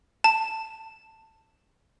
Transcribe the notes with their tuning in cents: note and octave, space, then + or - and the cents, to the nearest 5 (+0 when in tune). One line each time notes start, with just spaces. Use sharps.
A5 +15